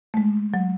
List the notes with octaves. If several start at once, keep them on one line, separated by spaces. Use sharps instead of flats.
A3
G#3
F#3